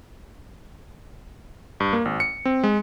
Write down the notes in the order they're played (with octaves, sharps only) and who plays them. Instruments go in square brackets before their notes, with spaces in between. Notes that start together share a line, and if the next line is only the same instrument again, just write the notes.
[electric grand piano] G2
A#3
G#1
C#7
C4
G#3